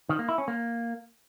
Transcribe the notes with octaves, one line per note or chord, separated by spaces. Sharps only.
D#3
A#3
E4
C#4
A#3